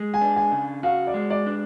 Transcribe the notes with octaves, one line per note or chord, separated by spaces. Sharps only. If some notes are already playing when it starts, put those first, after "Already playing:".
Already playing: G#3
G#5
D4
G#5
C#3
F#4 F5
D5
G#3
D5
D4